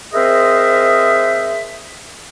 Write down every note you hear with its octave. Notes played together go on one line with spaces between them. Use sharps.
C4 G#4 A#4 C5 D#5 E5